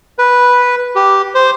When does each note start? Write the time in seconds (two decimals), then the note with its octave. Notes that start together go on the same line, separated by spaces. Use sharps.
0.19 B4
0.96 G4
1.35 C5